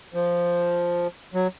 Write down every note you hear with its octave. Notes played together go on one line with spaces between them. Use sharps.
F3
F#3